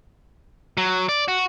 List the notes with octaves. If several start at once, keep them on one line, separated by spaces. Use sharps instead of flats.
F#3
D5
F#4